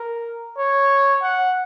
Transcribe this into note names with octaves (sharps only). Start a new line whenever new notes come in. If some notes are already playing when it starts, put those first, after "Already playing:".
Already playing: A#4
C#5
F#5